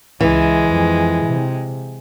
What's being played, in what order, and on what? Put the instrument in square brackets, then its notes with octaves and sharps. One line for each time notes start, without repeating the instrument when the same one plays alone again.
[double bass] C#2 [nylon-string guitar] E3 [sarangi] G#3
[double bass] F2
C3